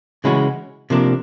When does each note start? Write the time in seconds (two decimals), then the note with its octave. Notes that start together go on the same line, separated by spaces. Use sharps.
0.24 C#3 E3 G#3 C#4 F#4
0.90 C3 F3 A#3 D4